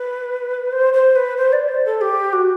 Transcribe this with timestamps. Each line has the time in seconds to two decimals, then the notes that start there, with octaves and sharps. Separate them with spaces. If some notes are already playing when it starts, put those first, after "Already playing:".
Already playing: B4
0.72 C5
0.93 C5
1.15 B4
1.37 C5
1.52 D5
1.68 C5
1.85 A4
2.01 G4
2.33 F#4